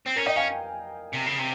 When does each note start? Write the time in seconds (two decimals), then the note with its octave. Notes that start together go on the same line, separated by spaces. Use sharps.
0.06 C4
0.16 C#4 A#4
0.26 D#4 D#5 G5
0.36 C#4 F5 G#5
1.14 C3
1.27 C#3
1.39 C3